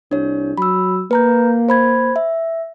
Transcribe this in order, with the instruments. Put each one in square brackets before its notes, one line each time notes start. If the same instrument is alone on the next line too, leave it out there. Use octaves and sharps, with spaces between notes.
[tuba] C2 [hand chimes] D4 C#5
[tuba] F#3 [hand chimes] B5 E6
[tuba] A#3 [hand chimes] B4 A#5 G6
[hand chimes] C5 B5 G#6
E5